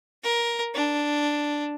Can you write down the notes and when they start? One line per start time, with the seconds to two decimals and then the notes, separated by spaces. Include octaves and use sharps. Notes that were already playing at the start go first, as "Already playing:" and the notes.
0.24 A#4
0.75 D4